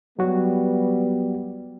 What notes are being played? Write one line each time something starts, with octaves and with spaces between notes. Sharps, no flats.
F#3 G3 B3 F#4